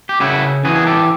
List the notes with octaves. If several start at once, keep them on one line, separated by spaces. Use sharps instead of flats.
G4
C#3 E4 F#4
E3 F#4 G#4
G#4
G4 A4